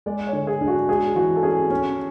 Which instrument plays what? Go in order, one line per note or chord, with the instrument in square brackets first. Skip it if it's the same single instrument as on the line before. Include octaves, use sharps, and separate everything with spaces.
[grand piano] G#3 [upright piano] D5
[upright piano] C#5
[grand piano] D3
[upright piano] G#4
[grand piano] D4
[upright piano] F#4
[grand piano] G#3 [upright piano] G#4
[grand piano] E3 [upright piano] F#4
[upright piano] A4
[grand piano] C#4 [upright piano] G#4
[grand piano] C#4